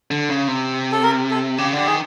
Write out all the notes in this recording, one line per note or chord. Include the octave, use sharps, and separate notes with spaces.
D3
C#3
C3
A4
A#4
A4
C#3 G4
D3 G4
D#3 G#4